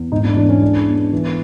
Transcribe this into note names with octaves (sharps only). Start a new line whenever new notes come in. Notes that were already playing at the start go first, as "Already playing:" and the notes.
Already playing: E2
G#2 D#4
D4
E3 D4
C#4
G#3 D4
B3
E3